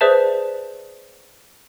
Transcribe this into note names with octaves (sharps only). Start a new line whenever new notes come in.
G#4 B4 C5 D5 E5 A5